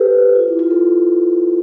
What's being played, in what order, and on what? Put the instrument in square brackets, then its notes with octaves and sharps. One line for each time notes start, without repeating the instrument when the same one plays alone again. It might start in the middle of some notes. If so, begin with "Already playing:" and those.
Already playing: [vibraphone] G4 A4 B4 C5
F4
E4
F4
A4